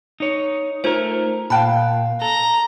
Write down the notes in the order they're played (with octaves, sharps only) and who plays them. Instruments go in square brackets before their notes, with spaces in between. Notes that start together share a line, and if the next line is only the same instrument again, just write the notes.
[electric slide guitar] D#4 C#5
[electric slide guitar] A3 A#4 [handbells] D#4 F4 C5
[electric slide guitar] A#2 [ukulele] F5 G5 A5 [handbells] B5 F#6
[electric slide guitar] A4 [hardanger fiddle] A#5